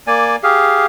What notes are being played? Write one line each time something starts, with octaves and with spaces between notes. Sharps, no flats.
A#3 D5 G#5
G4 G#4 F5